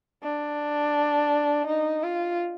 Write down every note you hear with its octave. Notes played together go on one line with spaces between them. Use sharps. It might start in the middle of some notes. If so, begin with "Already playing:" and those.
D4
D#4
F4